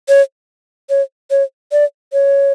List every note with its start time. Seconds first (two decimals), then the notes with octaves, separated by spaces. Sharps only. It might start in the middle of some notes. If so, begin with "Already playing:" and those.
0.09 C#5
0.90 C#5
1.31 C#5
1.72 D5
2.13 C#5